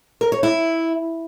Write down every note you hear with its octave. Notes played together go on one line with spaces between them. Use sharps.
A#4
C#5
E4